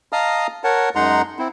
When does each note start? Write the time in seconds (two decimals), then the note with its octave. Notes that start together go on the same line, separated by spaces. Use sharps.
0.13 D#5 F5 A5 A#5 D#6 F6
0.64 A#4 C#5 F#5 A5
0.95 F#2 G#3 D#4 F#5 A#5 C6
1.39 C4 E4